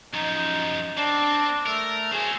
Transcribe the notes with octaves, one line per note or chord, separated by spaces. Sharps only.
F#2 F3 D#4
C4 D4
A3 A#4
F#3 G#4 C5